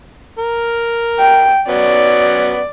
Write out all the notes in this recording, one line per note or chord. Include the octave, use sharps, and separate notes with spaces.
A#4
G5
F#3 B3 C#4 D5